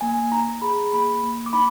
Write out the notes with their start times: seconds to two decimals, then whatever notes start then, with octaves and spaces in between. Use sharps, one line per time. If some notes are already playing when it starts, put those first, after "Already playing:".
0.01 A#3 G#5
0.32 D#4 A#5
0.62 G#4 B5
0.92 A#3 B5
1.24 A#3
1.46 D6
1.53 D#4 B5